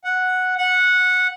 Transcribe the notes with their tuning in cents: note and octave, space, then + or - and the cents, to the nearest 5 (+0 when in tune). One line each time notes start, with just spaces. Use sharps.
F#5 -5
F#5 -10